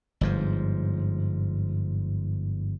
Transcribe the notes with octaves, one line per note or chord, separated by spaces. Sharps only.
G1 G#2 F3